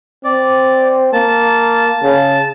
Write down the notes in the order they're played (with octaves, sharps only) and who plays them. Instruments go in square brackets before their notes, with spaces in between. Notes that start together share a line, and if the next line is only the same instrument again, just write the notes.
[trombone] C4 [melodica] D5
[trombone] A#3 [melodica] A5
[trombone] C#3